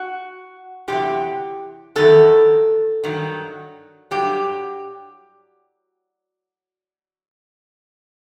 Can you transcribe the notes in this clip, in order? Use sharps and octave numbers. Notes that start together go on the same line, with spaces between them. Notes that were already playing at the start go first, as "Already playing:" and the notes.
Already playing: F#4
E2 C3 F#3 G4
E2 D#3 F#3 A4
G2 D#3 F#3
G2 F#3 G4